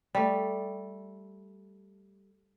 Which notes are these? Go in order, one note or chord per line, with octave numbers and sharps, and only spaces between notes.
G3 A3